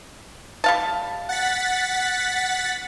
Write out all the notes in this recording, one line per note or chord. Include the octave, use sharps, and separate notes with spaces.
G3 F5 A5
F#5 A6 B6